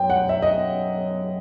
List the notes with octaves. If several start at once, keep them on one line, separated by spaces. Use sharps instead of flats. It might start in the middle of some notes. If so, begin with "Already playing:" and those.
Already playing: F#2 G5
F#5
E5
D#5